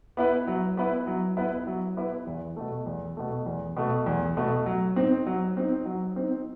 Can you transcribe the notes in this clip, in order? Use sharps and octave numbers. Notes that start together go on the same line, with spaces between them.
B3 E4 B4
F#3
B3 E4 B4
F#3
B3 E4 B4
F#3
B3 E4 B4
E2
B2 A3
E2
B2 A3
E2
B2 A3
E2
B2 A3
F#3
C4 D#4
F#3
C4 D#4
F#3
C4 D#4